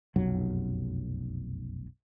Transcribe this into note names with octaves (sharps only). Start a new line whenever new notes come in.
F1 B1 F#2 F#3